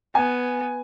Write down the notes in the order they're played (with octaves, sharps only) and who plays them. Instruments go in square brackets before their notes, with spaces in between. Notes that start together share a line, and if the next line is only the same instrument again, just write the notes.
[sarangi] B3 [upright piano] G#5